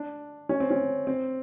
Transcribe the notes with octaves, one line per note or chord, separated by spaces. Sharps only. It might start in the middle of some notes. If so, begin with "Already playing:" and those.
Already playing: D4
C#4
C4
C#4
C4